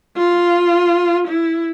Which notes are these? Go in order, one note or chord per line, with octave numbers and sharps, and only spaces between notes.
F4
E4